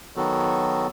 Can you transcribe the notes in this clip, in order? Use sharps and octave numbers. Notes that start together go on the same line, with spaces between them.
D#3 F#3 B3 F#4 A4